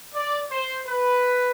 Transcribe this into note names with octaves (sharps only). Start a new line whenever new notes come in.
D5
C5
B4